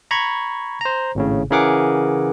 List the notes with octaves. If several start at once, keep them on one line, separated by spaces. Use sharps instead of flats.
A#5 B5 C#6 G#6
C5 A#5
G#1 A2 C#3
C#3 E3 G#4 A#4 F#5 D6